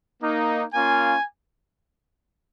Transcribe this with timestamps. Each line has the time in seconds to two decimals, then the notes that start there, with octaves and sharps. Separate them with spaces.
0.21 A#3 D#4
0.73 A#3 C#4 F4 G#5